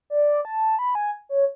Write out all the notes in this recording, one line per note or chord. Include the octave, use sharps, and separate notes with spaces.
D5
A5
B5
G#5
C#5